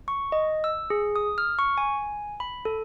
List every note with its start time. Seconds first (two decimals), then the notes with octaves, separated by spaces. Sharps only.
0.08 C#6
0.32 D#5
0.64 E6
0.90 G#4
1.16 D#6
1.38 F6
1.59 C#6
1.78 G#5
2.40 B5
2.65 A4